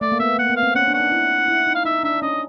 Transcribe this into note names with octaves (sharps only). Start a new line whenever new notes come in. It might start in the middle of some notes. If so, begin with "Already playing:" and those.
A3 D5
A#3
B3 E5
A#3 F#5
B3
F5
C4
C#4 F#5
D4
F#5
D#4
E4
E4
D#4
F5
D#4 E5
D4 E5
C#4 D#5